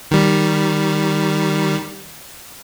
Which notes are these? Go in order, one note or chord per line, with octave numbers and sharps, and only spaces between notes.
D#3 G3